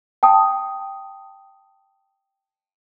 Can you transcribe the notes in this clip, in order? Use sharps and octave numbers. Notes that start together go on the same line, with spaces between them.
G5 A5 D#6